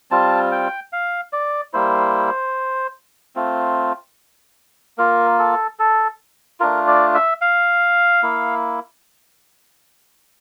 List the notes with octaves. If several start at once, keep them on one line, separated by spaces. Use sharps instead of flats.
G3 C4 F4 A5
G5
F5
D5
G3 A#3 E4 C5
A3 C4 F4
A#3 F4 A#4
A4
A4
A3 D4 F4 A#4
D5
E5
F5
A#3 E4